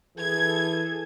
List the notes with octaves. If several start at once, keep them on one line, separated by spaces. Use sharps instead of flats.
E3 G#4 A4 G#6